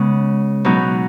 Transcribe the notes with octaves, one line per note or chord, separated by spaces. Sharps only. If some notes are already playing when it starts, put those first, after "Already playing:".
Already playing: C#3 G#3 B3
B2 F#3 B3 D#4